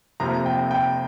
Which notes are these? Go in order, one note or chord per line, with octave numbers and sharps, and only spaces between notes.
F1 F2 C3 F3 A#3 A#5
G5
G5